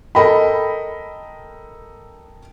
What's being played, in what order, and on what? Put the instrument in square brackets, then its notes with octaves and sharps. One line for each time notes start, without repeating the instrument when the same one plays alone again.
[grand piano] A4 A#4 D#5 G5 B5